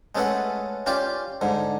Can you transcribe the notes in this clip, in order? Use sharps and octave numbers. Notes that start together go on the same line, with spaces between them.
G#3 A3 C#4 A4 B4 F#5
C#4 F4 G4 D5
G#2 D3